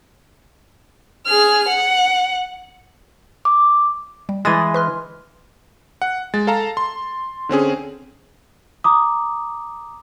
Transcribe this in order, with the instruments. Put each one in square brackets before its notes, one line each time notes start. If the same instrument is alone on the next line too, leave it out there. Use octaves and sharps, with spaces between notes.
[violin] G#4 F6
F#5
[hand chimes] D6
[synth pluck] G3
[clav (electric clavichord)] E3 G#3 [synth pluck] D#6 A6 D#7
[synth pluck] B4 C6 F6
[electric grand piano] F#5
G#3 A6
A4 F5 A5 A#5
C6
D3 C4 C#4 G#4
[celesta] A#5 D6 D#6